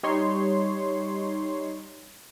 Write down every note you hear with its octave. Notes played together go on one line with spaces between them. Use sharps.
G3 D#4 C#5 C6